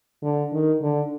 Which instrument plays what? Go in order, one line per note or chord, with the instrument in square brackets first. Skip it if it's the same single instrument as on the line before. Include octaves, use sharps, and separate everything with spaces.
[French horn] D3
D#3
D3